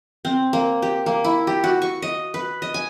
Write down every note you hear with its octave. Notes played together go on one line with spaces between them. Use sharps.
C4
A#3
G4
A#3
E4
G4
F#4
C#6
D#5
B4
D#5
G#5